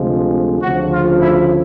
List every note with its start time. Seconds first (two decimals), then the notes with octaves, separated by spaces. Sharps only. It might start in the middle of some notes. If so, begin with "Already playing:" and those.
Already playing: D2 C3 F3 G#3
0.62 D2 C#3 F3 F#4
0.92 F4
1.21 E4